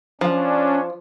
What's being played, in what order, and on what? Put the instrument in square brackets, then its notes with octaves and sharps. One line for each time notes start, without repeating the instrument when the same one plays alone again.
[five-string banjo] F3 [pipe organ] C#4 D4